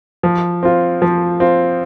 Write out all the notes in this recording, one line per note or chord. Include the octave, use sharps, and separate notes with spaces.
F3
C4 F4
F3
C4 F4